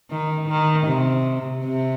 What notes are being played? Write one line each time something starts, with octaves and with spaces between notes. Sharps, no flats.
D#3
D#3
C3
C3